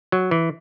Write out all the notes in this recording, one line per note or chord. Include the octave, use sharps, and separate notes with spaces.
F#3
E3